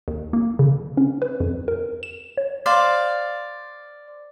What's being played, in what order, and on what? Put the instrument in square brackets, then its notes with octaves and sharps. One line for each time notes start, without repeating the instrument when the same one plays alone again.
[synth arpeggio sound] D#2
A#3
C#3
C#4
B4
F2
A#4
E7
C#5
[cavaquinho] C5 D5 F5